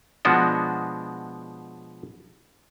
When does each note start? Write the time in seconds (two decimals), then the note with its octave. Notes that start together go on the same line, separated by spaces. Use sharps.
0.25 B2 F3 G#3 B3 D4 F#4